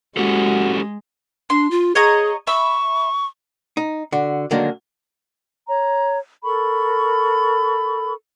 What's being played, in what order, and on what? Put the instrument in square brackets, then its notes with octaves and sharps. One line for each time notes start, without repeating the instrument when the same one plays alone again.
[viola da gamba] G#3 [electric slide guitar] C#4 G4 A4 [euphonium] F#4
[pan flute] D4 [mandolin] C6
[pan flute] F4
[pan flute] G#4 [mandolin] C#5 D#5 A#5
[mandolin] E5 B5 [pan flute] C#6
[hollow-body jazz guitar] D#4
D3 F#4
D3 D#3 F#3 G#3 A#3 D4
[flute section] C#5 A#5
A4 A#4 B5 C#6